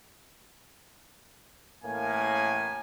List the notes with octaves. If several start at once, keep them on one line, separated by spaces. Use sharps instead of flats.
A1 A2 A#3 G#5